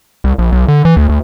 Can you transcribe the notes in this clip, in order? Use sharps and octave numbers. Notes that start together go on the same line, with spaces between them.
C2
A#1
B1
D3
E3
D2
D2